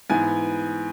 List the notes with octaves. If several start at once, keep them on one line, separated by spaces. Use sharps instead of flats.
G#2 E3 B3 G#5